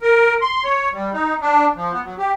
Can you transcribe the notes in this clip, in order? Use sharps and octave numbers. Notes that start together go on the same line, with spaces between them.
A#4
C6
C#5
G3
D#4
D4
F3
B3
F#3
G4